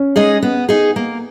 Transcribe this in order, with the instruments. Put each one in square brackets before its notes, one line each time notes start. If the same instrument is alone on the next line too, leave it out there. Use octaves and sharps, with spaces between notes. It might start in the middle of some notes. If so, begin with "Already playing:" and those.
Already playing: [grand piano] C#4
[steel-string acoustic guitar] G#3 D#4 G#4 D#5
B3
D#4 G#4
A#3